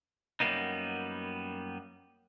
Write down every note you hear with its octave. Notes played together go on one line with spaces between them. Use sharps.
F#2 E3 G3 A#3 B3 D#4